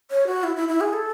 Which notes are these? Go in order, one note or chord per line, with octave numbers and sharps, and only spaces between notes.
C#5
F#4
E4
E4
E4
G#4
A4